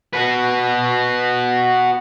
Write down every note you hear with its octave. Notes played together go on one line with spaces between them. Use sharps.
F#4 B4